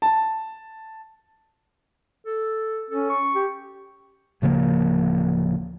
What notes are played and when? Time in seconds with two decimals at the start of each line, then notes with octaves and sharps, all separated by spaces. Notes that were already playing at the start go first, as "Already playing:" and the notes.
0.02 A5
2.25 A4
2.90 C#4 A4
3.10 C#6
3.35 G4
4.42 D1 C#3 F3 A#3